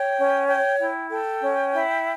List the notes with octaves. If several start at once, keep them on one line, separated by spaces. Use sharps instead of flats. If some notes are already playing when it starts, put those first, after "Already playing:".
Already playing: C#5 G5
C#4
C#5 G5
E4 G5
A4 G5
C#4
E4